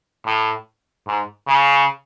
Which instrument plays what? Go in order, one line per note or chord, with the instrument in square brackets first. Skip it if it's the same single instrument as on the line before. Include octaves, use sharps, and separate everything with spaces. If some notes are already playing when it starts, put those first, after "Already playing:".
[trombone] A2
G#2
C#3